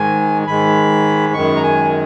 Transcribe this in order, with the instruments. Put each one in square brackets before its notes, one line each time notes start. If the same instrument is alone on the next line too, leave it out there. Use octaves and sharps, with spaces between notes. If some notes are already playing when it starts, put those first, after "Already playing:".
Already playing: [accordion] G#2 D#3 G#3 G#5
G#2 D#3 G#3 B5
F#2 D#3 G#3 C#6
A#5
G#5